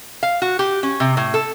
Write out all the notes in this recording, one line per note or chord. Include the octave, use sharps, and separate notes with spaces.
F5
F#4
G4
C#4
C3
A2
A4